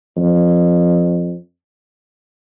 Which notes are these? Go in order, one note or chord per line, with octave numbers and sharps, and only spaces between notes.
F2